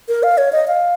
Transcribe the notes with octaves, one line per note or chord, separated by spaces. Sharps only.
A#4
F5
C#5
D#5
F5